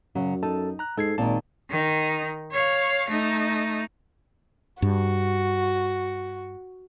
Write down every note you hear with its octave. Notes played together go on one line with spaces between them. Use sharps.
F#2 C#3 F#3
D#4 A4 A5
A#5 F#6
G#2 G#3 A4 G#6 C7
G#1 A#2 D#3 D#4 A5
D#3 D#4
C#5 F5
A3 D#4
G2 F#4